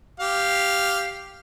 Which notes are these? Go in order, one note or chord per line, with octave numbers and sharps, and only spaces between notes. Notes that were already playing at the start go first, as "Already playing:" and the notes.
G4 F5